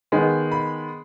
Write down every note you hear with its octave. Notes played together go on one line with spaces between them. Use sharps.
D#3 G#3 B3
B5